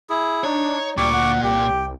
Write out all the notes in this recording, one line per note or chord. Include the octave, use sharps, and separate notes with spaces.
E4 G#4
D4 D#4 C#5
D2 A#2 G3 C#6 D6
F#5
C2 G4 F#5
G5